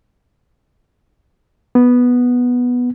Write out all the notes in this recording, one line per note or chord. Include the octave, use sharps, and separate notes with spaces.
B3